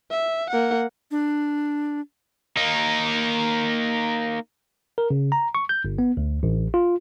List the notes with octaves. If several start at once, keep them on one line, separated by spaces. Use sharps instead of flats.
E5
A#3 F#5
D4
A#3 D#4
A#4
C#3
A#5
C#6
G6
G1
B3
D2
A1
F4